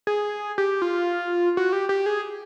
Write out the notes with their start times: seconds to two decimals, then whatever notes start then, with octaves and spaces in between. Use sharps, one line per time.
0.07 G#4
0.58 G4
0.82 F4
1.57 F#4
1.73 G4
1.89 G4
2.06 G#4